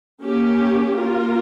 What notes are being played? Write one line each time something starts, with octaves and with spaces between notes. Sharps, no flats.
A#3 C#4 G4
A#3 F4 A#4